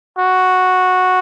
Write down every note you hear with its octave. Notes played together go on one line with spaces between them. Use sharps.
F#4